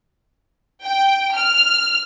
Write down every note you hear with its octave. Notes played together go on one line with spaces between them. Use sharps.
G5
F6